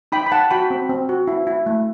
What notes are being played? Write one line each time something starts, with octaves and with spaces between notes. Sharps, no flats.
D#4 G5 B5
B5
D#4 F#5 A5
F#4 G5 B5
C4
C4
F#4
E4
E4
A3